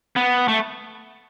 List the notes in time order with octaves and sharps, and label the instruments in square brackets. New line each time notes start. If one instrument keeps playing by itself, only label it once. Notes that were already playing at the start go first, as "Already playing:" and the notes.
[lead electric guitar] B3
A3